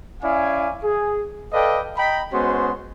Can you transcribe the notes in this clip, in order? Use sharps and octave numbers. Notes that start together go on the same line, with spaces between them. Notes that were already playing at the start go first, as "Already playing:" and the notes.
C#4 E4 D5 F5 G#5
G#4
A4 B4 D5 D#5 F5 G5
D#5 G5 A#5 B5
G#3 B3 C#4 F#4 C5 C6